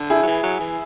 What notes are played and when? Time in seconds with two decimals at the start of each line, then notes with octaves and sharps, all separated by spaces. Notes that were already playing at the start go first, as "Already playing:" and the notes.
Already playing: D3
0.10 E4 G#4
0.23 F#3
0.27 E3
0.43 F#3
0.60 E3